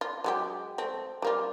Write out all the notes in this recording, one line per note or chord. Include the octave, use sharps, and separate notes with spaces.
F4
F#3 G#3 G4
A3 C4
G3 A#3 F4